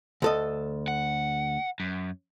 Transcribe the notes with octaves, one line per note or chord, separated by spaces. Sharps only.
D2 A4 D#5
F#5
F#2